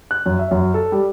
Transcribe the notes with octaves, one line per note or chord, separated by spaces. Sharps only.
F#6
F#2
E5
F#2
A4
G3